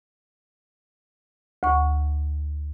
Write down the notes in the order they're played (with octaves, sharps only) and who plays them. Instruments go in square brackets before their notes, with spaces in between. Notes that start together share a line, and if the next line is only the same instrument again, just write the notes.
[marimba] D2 C#6